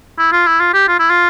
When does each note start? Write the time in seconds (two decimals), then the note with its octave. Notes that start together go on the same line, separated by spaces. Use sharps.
0.18 E4
0.32 F4
0.47 E4
0.60 F4
0.74 G4
0.88 F4
0.99 E4
1.10 F4